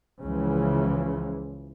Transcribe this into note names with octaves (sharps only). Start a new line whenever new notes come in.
C#2 C#3 E3 F3